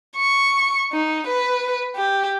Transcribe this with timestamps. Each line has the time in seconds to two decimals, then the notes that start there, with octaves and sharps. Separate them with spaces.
0.17 C#6
0.92 D#4
1.27 B4
1.96 G4